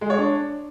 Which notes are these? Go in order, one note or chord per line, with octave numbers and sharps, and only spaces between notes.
G#3
C#5
D4